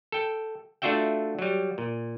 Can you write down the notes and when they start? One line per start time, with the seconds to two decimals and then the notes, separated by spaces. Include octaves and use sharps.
0.12 A4 G5
0.82 A3 D4 F4 F#4 E5 G5
1.39 F#3 G3
1.78 A#2